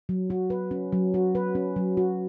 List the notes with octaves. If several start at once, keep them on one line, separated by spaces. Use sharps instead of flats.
F#3
F#4
B4
C#4
F#3
F#4
B4
C#4
F#3
F#4